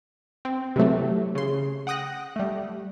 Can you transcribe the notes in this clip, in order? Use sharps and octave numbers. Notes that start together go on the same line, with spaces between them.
C4
C3 E3 F#3 A3
C#3 C6
F#5 G5 D#6 F#6 A#6
G3 A3